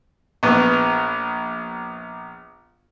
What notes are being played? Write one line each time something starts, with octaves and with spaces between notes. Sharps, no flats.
A#1 B3